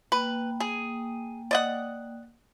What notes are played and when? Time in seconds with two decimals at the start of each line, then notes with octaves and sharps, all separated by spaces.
0.12 A#3 B4 G5
0.60 G#4
1.51 D5 D#5 F#5